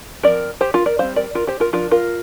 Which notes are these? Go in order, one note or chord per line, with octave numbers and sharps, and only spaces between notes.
F3 C4 A#4 D5
G4 C5
F4 A#4
A#4 D5
G3 C4 C5 F5
A#4 D5
F4 A#4
G4 C5
F4 A#4
F3 D4 F4 A#4
F4 A#4